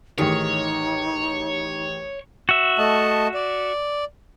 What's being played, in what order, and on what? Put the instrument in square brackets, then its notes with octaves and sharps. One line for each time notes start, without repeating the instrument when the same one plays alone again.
[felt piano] A1 G4 G#4 [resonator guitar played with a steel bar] D#3 [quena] D#4 [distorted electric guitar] C#5
[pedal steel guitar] F#4 E5
[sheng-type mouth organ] A3 D#5 A5
D5